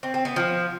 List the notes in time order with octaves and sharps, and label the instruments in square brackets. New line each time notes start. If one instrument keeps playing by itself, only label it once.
[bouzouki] C4
C4
B3
F3